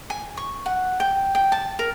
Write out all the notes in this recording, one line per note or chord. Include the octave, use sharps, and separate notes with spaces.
G#5
C#6
F#5
G5
G5
A5
A#4